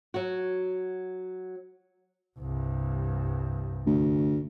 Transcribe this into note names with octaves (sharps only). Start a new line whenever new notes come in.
F#3 F#4
C2 G2
D2